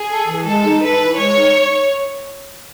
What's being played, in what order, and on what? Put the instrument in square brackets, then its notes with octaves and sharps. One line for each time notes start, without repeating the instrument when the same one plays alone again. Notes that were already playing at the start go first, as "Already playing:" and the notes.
Already playing: [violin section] G#4
[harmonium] A4
E3
[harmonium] G#3 [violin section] A4
[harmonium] D#4
[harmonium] A4 [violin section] B4
[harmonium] E3
[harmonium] G#3 [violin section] C#5
[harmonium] D#4